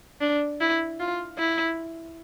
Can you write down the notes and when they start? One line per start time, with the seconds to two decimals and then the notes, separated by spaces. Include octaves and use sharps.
0.21 D4
0.61 E4
1.00 F4
1.38 E4